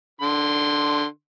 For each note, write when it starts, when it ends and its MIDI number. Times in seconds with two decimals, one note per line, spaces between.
0.21 1.05 50
0.21 1.05 84